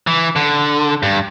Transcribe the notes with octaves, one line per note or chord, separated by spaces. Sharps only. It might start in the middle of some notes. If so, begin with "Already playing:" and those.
E3
D3
G2